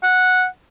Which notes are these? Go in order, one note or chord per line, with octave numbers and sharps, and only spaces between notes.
F#5